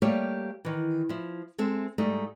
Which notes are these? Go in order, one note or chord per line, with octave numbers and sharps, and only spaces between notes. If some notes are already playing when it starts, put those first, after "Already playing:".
G3 A3 A#3 G4 C#5 F5
D#3 E3
F3 E4
G#3 C4 A4 E5
G#2 G3 A3 D#4